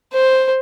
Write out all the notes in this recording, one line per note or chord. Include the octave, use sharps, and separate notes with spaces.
C5